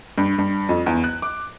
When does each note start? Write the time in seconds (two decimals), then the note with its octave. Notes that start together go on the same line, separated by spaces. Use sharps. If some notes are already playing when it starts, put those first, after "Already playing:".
0.18 G2
0.38 G2
0.69 F2
0.86 E2
1.04 F#6
1.22 D6